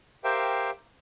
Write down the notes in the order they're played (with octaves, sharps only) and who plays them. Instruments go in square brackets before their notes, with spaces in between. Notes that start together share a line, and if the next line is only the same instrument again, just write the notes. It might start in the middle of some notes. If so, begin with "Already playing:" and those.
[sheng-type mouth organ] G4 A#4 C5 E5 F5 G5